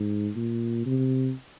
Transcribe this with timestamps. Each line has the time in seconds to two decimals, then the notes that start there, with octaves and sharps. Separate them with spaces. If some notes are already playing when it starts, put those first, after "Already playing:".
Already playing: G#2
0.36 A#2
0.86 C3